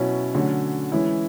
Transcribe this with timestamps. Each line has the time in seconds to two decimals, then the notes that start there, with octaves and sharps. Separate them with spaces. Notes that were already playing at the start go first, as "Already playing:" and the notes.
Already playing: B2 F#3 C#4 E4
0.34 D3 F#3 A3 C#4
0.92 E3 G#3 C#4 E4